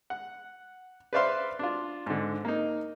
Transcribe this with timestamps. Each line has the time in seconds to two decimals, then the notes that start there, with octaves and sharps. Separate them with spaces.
0.10 F#5
1.13 B4 C5 D5 E5 F5 C6
1.59 D4 F4
2.06 G#2 D3
2.45 A#3 D#4